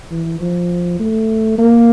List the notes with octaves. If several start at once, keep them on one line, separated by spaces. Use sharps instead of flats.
E3
F3
A3
A#3